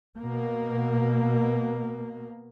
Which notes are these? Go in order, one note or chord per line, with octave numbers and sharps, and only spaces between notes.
B2 A#3